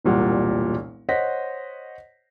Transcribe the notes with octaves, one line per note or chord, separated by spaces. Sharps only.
E1 C2 A#2 G3 F#5
C5 C#5 D#5 F#5 A#6 B6